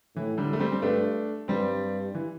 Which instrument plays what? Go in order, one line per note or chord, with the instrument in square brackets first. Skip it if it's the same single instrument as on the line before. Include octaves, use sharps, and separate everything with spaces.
[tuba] A2 [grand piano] E3
[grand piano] D3 G3
A3
G3 C4
C4
[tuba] G2 [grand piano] A3 D4
[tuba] G2 [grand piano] G3 C4
[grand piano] E3